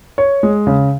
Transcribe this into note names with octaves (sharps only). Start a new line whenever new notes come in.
C#5
G#3
C#3